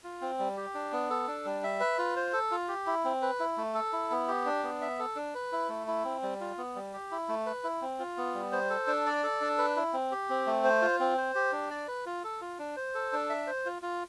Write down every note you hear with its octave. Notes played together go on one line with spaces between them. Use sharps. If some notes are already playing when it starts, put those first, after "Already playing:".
F4
C4
G3
G4
D4
B3
A4
D4
G3
E5
B4
F4
C5
A4
F4
G4
E4
C4
B4
E4
A3
A4
E4
B3
G4
D4
B3
E5
A4
D4
B4
E4
A3
E4
C4
G3
F4
B3
G3
G4
E4
A3
B4
E4
C4
F4
B3
G3
C5
A4
D4
D5
A4
D4
B4
E4
C4
G4
C4
A3
C5
F4
C4
C5
G4
D4
D5
B4
F4
A4
F4
D4
C5
A4
D4
E5
C5
F4
F4